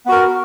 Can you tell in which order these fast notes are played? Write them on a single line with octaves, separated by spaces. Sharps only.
B3 F#4 A#4